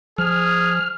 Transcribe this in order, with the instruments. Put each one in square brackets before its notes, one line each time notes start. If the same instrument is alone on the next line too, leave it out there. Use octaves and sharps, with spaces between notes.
[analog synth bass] F3 [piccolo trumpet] G#4 [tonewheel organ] F6